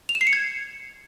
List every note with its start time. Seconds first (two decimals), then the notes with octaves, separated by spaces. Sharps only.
0.09 F7
0.15 E7
0.21 C7
0.27 C#7
0.33 G#6